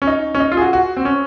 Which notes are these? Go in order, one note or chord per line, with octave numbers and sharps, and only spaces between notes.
C#4
D#4
C#4
D#4
F4
G#4
F#4
F#4
C4
C#4